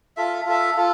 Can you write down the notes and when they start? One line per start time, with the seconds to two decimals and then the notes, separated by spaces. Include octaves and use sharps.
0.17 F4 A4 E5
0.46 F4 A4 E5
0.77 F4 A4